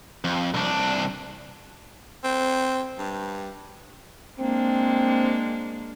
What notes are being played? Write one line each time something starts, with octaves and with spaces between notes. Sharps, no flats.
F2
C2 D4
C4
G2
G#3 A#3 C4 D4